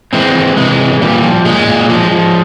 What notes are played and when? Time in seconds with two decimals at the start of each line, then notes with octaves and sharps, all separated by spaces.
0.13 E3 G#3 C4
0.35 E3
0.57 C3 G#3
0.80 E3
1.01 A#2 G3
1.23 F3
1.45 A#2 G#3
1.68 A#2
1.89 F3 G#3
2.11 F3